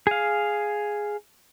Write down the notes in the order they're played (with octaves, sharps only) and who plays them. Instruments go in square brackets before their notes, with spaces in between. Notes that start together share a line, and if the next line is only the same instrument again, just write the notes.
[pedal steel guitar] G#4 F5